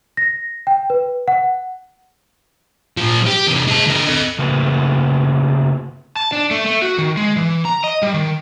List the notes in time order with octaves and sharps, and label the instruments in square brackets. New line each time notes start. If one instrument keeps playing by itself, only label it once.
[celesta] A#6
G5
B4
F#5
[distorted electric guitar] A#2 F3
G4
E2 C3
G#3 A5
D3 A#4
A4 D#5
[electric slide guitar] C#3 A3 A#3 C4 F#4 B4
A5
D4
A3
A3
F#4
D#3
G#3
E3
A#5
D#5
G3
D#3